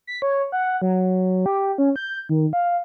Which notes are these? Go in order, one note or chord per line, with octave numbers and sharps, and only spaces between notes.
B6
C#5
F#5
F#3
G4
C#4
G6
D#3
F5